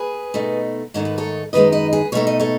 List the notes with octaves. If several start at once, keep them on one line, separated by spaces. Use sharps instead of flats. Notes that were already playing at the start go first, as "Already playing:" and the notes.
Already playing: G#4 B4
B2 A3 D#4
G#2 D#3 A3 D#4 C#5
B4
A4 C#5
F#2 D#3 G#3 D#4 B4 D#5
B4 D#5
G#4 B4
B2 A3 D#4 C#5
D#5
A4 C#5